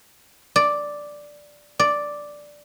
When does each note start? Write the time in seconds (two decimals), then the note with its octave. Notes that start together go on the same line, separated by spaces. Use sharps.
0.56 D5
1.79 D5